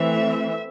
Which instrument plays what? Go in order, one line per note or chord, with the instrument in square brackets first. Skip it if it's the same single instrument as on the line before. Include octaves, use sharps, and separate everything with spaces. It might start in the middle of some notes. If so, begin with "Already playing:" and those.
Already playing: [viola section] E3 A3 C4 E5